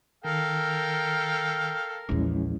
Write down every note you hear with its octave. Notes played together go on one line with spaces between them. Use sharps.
D#3 A4 A#4 F5 G5
A#1 E2 G#3 C#4 E4